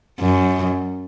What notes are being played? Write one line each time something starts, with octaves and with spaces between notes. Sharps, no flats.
F#2